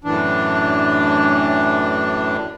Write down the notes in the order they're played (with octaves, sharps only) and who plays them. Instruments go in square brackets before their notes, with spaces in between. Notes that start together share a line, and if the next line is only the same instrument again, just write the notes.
[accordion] F#2 A2 E3 D4